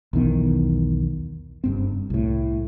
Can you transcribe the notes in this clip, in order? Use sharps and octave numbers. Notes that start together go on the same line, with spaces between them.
B1 E2 D#3 B3
F#1 G2 C4
C2 A2